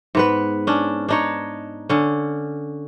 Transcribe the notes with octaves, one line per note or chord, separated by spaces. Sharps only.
G#2 B3 B4
C#4 D4
D4 D#4 C#5
D3 C#4